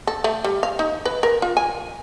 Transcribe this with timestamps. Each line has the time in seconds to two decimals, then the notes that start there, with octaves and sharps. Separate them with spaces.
0.07 A4
0.24 A3
0.44 G3
0.63 F5
0.79 D#4
1.05 B4
1.23 A#4
1.42 F4
1.57 G#5